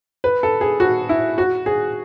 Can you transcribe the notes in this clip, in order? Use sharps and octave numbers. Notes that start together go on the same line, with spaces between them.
B4
A4
G#4
F#4
E4
F#4
G#4